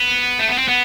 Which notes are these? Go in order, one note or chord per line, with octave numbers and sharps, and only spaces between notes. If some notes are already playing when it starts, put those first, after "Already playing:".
Already playing: B3
A3
B3
C4
B3